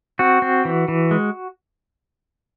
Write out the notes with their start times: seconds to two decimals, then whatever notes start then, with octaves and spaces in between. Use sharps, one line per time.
0.19 C4 F#4
0.42 C4
0.65 E3
0.88 E3
1.11 G#3